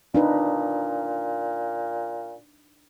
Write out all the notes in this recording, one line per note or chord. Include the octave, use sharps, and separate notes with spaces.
A#2 D4 D#4 B4